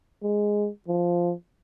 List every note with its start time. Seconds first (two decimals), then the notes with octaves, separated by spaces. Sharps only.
0.23 G#3
0.88 F3